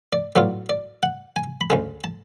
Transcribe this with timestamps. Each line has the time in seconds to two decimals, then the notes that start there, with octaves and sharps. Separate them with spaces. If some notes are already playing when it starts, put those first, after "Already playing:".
0.13 D5
0.36 A2 F#3 B3 F4 D5
0.69 D5
1.03 F#5
1.36 G#5
1.61 B5
1.70 D2 C#3 G#3 A5
2.04 A5